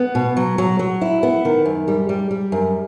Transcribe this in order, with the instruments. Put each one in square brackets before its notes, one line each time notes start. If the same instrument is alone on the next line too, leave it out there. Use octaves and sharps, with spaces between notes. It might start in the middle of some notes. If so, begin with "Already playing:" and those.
Already playing: [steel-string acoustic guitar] B3
B2
F#3
F#3
F#3
E4
B3
D#3
F#2
G3
G3
G3
F#2